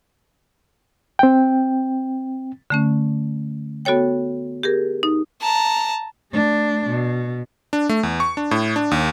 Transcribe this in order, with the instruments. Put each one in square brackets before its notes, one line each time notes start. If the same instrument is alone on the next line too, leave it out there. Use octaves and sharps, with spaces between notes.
[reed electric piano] C4 G5
[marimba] D3 A3 C#4
B3 F#4 A4 C#5 G5
G4 G#4 A#4
D#4
[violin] A5 A#5
[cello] A3 D4
B2
[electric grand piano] D4
A3
E2
C#6
D4
A2
D4
D#2